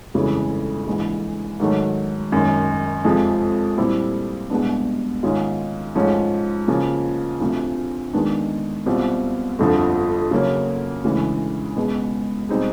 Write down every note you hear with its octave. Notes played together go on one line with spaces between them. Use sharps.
G1 F2 C#3 E3 G#3
A#1 G#2 E3
G#2 D#3 F#3 A3
G#1 F#2 D#3
F2 C3 F3 G#3
A#2 G3 C4 E4 G4
C2 B2 G#3 B3 D4
G#2 D#3 G#3 C#4 F4
G#2 F3 A3 C#4
C#3 F3 A#3
D2 C3 F3
D#2 D#3 G#3 B3 D4
C2 B2 G3 C4 F4
G1 F2 D3 F3
C#3 F#3 A#3 C#4
D2 C#3 E3 G#3
C#2 B2 G#3 B3
B2 G3 C4 D#4 G#4